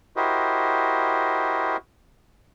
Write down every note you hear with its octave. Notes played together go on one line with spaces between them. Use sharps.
E4 F#4 G4 A#4 C5 D#5